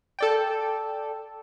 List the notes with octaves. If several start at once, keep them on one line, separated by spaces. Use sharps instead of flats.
A4 D5 G5